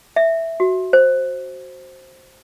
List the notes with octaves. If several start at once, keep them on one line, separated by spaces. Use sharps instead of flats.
E5
F#4
C5